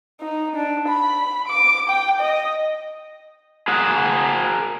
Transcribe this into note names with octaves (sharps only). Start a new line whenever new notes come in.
D#4
D4
B5
D6
G5
D#5
G#4 A#4 F#5